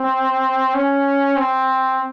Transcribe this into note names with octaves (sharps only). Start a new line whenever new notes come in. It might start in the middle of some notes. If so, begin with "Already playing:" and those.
Already playing: C4
C#4
C4